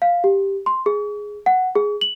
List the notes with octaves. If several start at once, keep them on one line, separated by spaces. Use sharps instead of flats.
F5
G4
C6
G#4
F#5
G#4
F#7